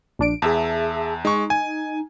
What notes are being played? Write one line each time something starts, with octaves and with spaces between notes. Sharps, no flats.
A#1 D4 D7
E2 G#4 E5 A5
G#3 D#4 C#6
G#5